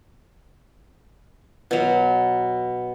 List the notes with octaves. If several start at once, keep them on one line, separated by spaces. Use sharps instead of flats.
B2 F#3